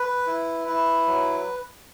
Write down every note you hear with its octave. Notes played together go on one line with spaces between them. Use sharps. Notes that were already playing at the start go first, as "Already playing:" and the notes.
Already playing: B4
E4
E4
F#3